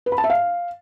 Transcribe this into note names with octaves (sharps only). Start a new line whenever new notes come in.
B4
B5
A5
E5
F5